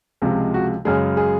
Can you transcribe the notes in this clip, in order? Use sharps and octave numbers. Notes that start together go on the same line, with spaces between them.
C#2 C3 F3 G#3
F#4
F#2 C#3 G#3 G#4
G#4